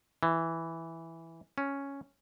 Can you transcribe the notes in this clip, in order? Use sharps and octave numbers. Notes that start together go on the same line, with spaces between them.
E3
C#4